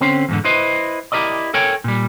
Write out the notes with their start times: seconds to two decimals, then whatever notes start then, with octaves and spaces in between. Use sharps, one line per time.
0.01 D3 C4 C#4 C5
0.29 E2 G#2 D3
0.45 E4 B4 C5 D#5
1.12 E4 G4 A#4 D5 D#5
1.54 A4 A#4 C#5 G5 G#5
1.84 A#2 G3